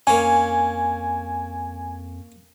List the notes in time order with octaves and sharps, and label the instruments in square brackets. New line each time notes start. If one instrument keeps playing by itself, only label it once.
[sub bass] F2 [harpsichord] A#3 C#4 [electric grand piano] G#5